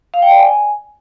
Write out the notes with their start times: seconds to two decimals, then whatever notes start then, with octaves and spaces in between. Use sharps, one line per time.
0.14 F5
0.22 G5
0.31 D5
0.40 G#5